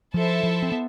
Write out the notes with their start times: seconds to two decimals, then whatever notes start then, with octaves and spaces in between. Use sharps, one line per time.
0.14 F3 E4 A4 C5 E5 A5
0.44 F3
0.63 C4
0.72 B3